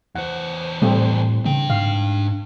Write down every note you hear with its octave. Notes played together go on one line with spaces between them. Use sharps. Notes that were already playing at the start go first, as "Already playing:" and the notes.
E2 C5 F#5
A2 G3 A3 C4
C#3 D4 G5
G#2 F5